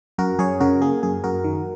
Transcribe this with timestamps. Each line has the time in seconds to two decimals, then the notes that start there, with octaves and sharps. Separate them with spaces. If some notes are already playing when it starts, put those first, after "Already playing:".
0.18 F#2 F#4 A#4
0.39 F#2 G#4 C#5
0.60 C#3 F#4 A#4
0.82 A#3 G#4
1.03 F#2 G#4
1.24 F#2 F#4 A#4
1.44 D#3